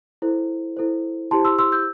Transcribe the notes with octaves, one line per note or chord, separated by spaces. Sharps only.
E4 A4 C5
E4 A4 C5
E4 G4 C5 A5 C6
C6 E6
C6 E6
E6 G6